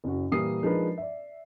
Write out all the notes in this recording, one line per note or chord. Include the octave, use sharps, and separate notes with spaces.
F#1 C#4 F#4
A#2 E3 G3 A#3 D#6 C7
F3 G#3 D4 D#4 A#4 B4
D5 E5